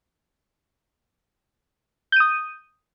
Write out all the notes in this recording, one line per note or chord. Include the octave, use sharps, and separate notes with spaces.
D#6 G6 D#7